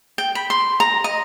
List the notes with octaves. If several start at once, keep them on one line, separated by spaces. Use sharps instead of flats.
G5
B5
C6
A#5
D#5